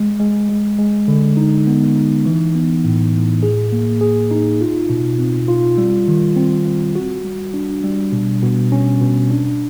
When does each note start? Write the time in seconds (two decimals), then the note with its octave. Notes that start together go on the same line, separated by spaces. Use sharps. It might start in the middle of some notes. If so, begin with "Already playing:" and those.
Already playing: G#3
0.20 G#3
0.49 G#3
0.78 G#3
1.08 D3
1.37 D#4
1.67 B3
1.96 D#4
2.26 E3
2.55 B3
2.84 A2
3.14 A2
3.43 G#4
3.72 A#3
4.01 G#4
4.31 D#4
4.61 F4
4.89 B2
5.19 C4
5.48 F4
5.78 G3
6.08 D#3
6.36 C4
6.66 C4
6.95 F#4
7.25 G3
7.54 D4
7.83 G3
8.12 B2
8.42 B2
8.72 C#4
9.01 B2
9.31 D4